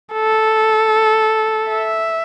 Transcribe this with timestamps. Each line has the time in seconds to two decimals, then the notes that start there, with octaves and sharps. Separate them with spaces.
0.14 A4
1.70 E5